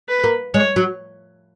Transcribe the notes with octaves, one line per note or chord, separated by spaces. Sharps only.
B4
A#3
G#3 C#5
F#3